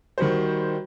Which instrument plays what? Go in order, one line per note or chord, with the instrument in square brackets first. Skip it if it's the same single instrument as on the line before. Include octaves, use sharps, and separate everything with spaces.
[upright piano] D#3 G3 F#4 C5